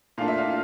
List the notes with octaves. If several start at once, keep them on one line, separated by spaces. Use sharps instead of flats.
A#2 A3 D4 F4 F5
E5
F5
F4